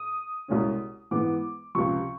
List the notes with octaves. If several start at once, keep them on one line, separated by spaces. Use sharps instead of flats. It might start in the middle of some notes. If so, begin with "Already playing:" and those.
Already playing: D#6
C2 B2 G#3 C#4
G#2 E3 G#3 B3 D6
C#2 C3 F3 C#6